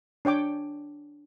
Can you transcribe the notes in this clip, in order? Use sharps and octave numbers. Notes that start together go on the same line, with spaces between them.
D4 C#5 G5 D6